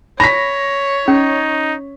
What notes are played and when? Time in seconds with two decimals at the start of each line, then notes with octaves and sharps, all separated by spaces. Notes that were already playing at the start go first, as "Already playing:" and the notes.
0.20 C#5 B5 A#6 B6
1.08 C#4 D#4